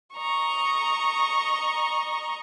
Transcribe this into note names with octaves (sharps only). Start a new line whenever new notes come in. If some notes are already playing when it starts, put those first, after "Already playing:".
D#5 A#5 C#6